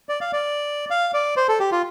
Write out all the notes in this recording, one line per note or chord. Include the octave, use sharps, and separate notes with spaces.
D5
F5
D5
F5
D5
C5
A4
G4
F4